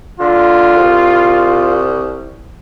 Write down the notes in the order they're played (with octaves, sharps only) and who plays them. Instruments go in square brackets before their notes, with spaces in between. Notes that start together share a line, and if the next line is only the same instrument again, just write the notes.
[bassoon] D3 [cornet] F4
[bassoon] C2